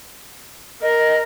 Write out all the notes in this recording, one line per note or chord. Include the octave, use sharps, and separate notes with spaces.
A#4 D#5